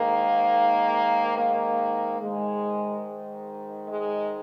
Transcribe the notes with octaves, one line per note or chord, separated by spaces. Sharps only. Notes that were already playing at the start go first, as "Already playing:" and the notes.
Already playing: G#2 D#3 A#3
A#3
G#2 D#3 G#3
G#3